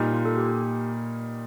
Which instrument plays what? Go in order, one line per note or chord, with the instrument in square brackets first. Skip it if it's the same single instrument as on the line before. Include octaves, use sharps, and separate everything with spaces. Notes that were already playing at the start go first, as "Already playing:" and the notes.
Already playing: [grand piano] A#2 G3 A#3 D#4
[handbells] F4
A4
G4